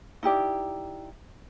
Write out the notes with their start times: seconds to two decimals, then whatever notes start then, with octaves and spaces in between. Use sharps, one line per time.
0.23 D#4 E4 G4 D5